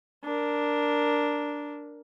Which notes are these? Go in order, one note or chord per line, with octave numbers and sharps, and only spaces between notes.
D4 A#4